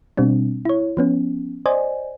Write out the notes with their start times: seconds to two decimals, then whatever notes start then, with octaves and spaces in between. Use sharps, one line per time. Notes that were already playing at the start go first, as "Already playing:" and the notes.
0.17 B2 G3 C4 D4
0.65 E4 C#5
0.97 F3 B3 C#4
1.66 C5 D5 D#5 G#5